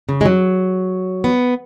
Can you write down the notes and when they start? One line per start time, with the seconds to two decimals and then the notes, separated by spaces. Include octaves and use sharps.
0.09 C#3
0.21 G#3
0.25 F#3
1.24 B3